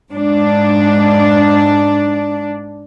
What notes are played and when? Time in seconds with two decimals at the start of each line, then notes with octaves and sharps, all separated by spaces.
0.12 G#2 D4